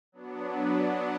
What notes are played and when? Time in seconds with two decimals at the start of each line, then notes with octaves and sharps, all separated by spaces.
0.12 F#3 B3 D4